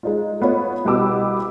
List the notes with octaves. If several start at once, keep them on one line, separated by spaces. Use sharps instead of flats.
G#3 D#4 F4
A3 B3 F4 C#5
C2 B2 B3 G4 D6 E6